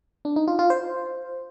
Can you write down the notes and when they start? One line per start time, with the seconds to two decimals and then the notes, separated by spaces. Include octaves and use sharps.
0.25 D4
0.36 D#4
0.48 F4
0.59 F4
0.70 C5